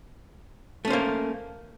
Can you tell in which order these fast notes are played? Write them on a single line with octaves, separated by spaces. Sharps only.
A3 C#4 C5 A#3